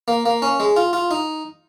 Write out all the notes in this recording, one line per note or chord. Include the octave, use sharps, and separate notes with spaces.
A#3
A#3
C#4
G#3
F4
F4
D#4